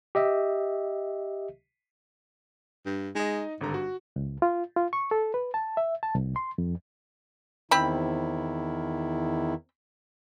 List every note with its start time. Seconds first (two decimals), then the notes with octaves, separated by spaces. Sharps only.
0.15 G4 D#5 E5
2.86 G2
3.15 G#3 D#4 D#5
3.61 G#1 G2 D3 A#5
3.74 F#4
4.16 C#2
4.42 F4
4.76 F4
4.93 C#6
5.11 A4
5.34 B4
5.54 A5
5.77 E5
6.03 A5
6.15 C2
6.36 C6
6.58 F2
7.71 E2 D#3 C4 E4 B5